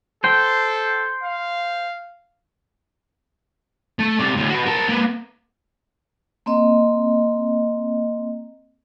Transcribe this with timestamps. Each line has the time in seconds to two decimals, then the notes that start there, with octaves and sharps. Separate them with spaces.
0.24 A4 C5 G5
1.23 F5
3.99 A3
4.19 C3 D5
4.36 D2 A2
4.50 F#4 B4
4.66 A#4 A5
4.88 A#3 B4
6.46 A#3 C4 D#5